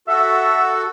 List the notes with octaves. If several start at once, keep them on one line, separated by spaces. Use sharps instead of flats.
F#4 A4 E5